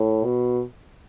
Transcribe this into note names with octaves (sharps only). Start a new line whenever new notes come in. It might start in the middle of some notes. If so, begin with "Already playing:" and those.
Already playing: A2
B2